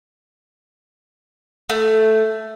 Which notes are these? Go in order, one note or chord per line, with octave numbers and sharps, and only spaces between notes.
A3